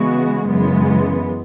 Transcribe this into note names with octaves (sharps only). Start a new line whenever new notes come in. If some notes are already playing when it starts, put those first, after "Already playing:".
Already playing: C#3 E3 G#3 B3 F#4
F#2 C#3 E3 G#3 B3